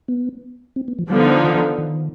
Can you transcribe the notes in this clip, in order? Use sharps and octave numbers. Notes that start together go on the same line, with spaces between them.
B3
C4
B3
F3
D3 F3 G3 B3 D#4
D#3
D#3